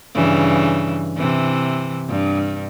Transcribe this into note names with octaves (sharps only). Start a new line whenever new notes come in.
G2 C#3 E3
C3 E3
G2